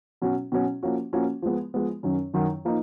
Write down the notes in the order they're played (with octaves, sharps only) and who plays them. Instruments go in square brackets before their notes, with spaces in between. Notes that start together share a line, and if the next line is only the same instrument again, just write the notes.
[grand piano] B2 F#3 C#4 F#4
B2 F#3 C#4 F#4
F3 A#3 C#4 F#4
F3 A#3 C#4 F#4
F3 G#3 B3
F3 G#3 B3
F#2 D#3 F#3 C#4
F#2 D#3 F#3 C#4
F3 A#3 D#4